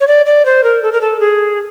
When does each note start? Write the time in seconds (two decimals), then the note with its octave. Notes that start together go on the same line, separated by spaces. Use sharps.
0.01 C#5
0.07 D5
0.26 D5
0.45 C5
0.64 A#4
0.83 A4
0.92 A#4
1.01 A4
1.20 G#4